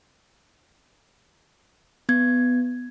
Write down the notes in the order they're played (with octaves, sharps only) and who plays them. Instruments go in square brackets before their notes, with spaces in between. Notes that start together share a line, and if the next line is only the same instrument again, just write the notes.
[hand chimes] B3 G#6